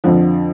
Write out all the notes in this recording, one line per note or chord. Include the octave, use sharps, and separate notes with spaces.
F2 D3 F3